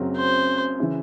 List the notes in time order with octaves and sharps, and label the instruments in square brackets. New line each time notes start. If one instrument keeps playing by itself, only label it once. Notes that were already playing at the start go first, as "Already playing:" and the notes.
Already playing: [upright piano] F#1 F#2 C#3 F#3 C4
[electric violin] C5
[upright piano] C#3 E3